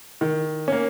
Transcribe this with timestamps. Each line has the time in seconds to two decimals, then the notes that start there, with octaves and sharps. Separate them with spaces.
0.21 D#3
0.68 A#3 C#4